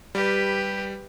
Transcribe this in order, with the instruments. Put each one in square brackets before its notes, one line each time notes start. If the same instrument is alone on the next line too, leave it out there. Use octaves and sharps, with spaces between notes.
[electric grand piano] G3 [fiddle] G4 B4